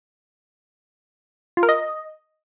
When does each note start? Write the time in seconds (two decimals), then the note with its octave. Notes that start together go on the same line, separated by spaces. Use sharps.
1.57 F4
1.63 A#4
1.69 D#5